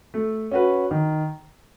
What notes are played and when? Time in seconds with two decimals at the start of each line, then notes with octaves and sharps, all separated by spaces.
0.14 A3
0.51 C#4 F#4 B4
0.91 D#3